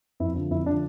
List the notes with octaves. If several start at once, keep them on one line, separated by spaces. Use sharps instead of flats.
F2 E4
D3 F3
F2 E4
D3 F3 D4